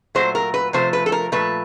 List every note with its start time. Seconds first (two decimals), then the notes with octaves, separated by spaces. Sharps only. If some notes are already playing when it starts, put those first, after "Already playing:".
0.15 A#2 F#3 A3 C5
0.35 A#4
0.54 B4
0.73 C3 F3 A3 C5
0.93 B4
1.06 A4
1.12 A#4
1.32 A#2 F3 A3 B4